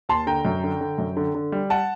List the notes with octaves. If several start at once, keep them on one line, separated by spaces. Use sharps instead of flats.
D#2 A5 C6
D3 G5 A#5
F#2
D3
D3
F#2
D3
D3
G3
F#5 A5